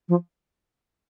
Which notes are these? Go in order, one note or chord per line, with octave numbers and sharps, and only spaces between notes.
F3